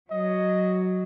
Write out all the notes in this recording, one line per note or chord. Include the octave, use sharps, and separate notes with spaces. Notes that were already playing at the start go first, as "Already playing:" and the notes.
F#3 D#5